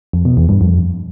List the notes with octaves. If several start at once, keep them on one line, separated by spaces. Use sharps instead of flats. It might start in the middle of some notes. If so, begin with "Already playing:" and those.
F2
B2
E2
G2
F2